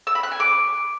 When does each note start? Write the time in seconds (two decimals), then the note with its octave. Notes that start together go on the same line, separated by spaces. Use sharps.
0.07 E6
0.15 B5
0.23 F#6
0.32 G#5
0.40 D6